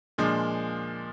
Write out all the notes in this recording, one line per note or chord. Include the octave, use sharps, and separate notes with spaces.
A#2 F3 G#3 D4